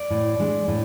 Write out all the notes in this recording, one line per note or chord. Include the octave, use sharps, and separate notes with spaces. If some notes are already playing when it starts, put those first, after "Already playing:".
Already playing: D5
A2
G#3 D4
A2